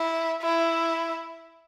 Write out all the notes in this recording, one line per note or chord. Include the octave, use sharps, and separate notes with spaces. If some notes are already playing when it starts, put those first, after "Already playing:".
Already playing: E4
E4